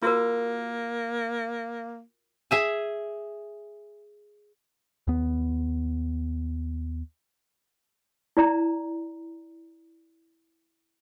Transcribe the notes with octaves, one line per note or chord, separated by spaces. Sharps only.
A#3 F4 F#4 A#4
G#4 E5 G#5
D#2 B3
E4 D5 A#5